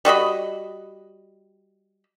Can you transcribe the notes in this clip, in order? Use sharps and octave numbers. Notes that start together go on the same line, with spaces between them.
G3 F#4 D#5 B5